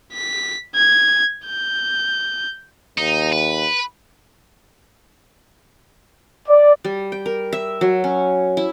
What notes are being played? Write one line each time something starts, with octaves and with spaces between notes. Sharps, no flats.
B6
G#6
G6
D#2 D#4
B4
D5
G3
G5
A#4
E5
F#3
C#4
E4